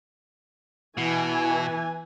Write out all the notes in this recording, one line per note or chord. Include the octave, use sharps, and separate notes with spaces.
B2 E3 G#5